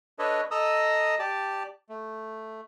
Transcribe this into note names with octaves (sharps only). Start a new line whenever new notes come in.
D4 A4 B4 C#5 D#5
A4 D#5 A#5 D#6 E6
G4 D5 A5
A3